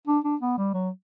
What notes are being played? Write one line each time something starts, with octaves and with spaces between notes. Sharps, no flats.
D4
D4
B3
G3
F#3